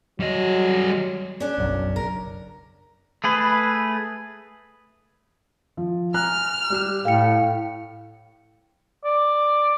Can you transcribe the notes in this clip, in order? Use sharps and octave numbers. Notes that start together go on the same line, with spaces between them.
F#3 G3 D#5
C#4 D4
F#1 B1 F#2
A#4
A3 G#4 B4
F3
G#5 A#5 F6 F#6
G3 G4 E7
A2 A3 F5 G5 C#7
D5